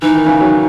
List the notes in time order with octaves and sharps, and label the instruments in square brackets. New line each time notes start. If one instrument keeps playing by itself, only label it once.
[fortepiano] E3 [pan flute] D#4
[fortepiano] D#3
C#3 E3
D#3 F#3